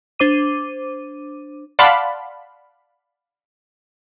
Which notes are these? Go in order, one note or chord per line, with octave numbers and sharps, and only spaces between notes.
D4 C5 D6 D#7
D5 F5 F#5 A5 B5 C6